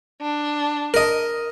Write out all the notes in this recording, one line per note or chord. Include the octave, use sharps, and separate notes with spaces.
D4
A#4 D#5